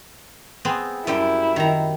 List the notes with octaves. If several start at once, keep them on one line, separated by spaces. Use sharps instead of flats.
B3 C4 G#4
F#2 G3 E4 G5
D#3 A#5